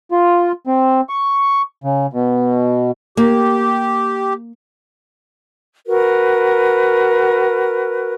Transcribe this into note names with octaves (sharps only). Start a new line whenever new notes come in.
F4
C4
C#6
C#3
B2
A#3 G4
F#4 A#4 B4